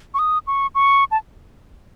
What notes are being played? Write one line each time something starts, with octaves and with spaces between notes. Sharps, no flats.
C#6
D#6
C#6
C#6
A5